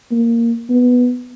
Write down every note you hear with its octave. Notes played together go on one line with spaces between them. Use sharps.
A#3
B3